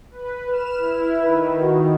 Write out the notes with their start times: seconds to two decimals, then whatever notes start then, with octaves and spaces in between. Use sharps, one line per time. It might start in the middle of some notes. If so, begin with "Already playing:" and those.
0.11 B4
0.47 B4 F6 E7
0.78 E4
1.22 D#3 B4
1.60 F#4